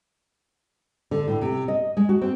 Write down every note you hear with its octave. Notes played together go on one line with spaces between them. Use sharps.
D3
A2
C3
D#5
G#3
F#4
C4